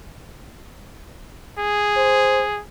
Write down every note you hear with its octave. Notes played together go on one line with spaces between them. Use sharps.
G#4
C5